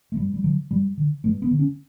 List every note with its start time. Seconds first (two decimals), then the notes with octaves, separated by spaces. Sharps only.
0.12 A3
0.17 G2 G3
0.34 G3
0.44 D3 F#3
0.71 G2 G3
0.98 D3
1.24 G2 A3
1.42 B3
1.51 D3
1.59 C#4